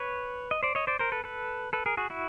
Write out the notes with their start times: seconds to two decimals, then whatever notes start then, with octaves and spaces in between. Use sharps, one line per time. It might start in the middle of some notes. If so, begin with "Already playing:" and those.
Already playing: B4 C#5
0.51 D#5
0.63 C5 D5
0.75 C#5 D#5
0.87 C5 D5
0.99 A#4 C5
1.12 A4 B4
1.24 A4 B4
1.73 A4 B4
1.86 G#4 A#4
1.97 F#4 G#4
2.10 E4 F#4